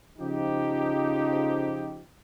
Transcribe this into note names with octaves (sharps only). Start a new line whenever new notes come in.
C#3 F3 D#4 G4